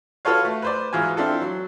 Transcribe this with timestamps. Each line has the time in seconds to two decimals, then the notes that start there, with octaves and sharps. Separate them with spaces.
0.25 F4 F#4 A4 B4 C#5 F5
0.45 A3
0.62 B4 C5 D5
0.93 G#2 E3 F4 F#4 G#5
1.17 C4 D4 E4 F4 A4
1.42 F#3